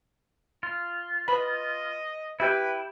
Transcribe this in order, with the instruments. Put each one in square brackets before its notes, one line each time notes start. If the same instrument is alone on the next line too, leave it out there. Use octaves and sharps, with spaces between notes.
[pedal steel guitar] F4
[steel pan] B4 B5 [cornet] D#5
[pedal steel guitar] E4 G5 [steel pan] G4 E5 [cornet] B4